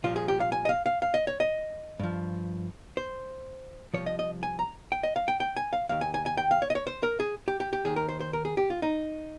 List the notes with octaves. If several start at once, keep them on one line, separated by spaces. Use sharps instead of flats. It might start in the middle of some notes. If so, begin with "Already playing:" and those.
C2 A#2 F3 F4
G#4
G4
F5
G#5
D#5
F5
F5
F5
D#5
C#5
D#5
G2 F3
C5
C2 A#2 F3 C#5
D#5
D#5
G#5
A#5
G5
D#5
F5
G5
G5
G#5
F5
D#2 D#3 F5
G#5
G#5
G#5
G5
F5
C#5
D#5
C#5
C5
A#4
G#4
G4
G4
G4
D#2 D#3 G#4
A#4
C5
C5
A#4
G#4
G4
F4
D#4